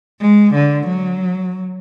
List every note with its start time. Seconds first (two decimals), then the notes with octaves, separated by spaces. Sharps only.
0.21 G#3
0.55 D3
0.88 F#3